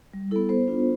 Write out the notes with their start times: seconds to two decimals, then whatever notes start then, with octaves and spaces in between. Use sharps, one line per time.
0.13 G3
0.31 B3 E4 A4
0.49 B3 C5
0.68 D4 F4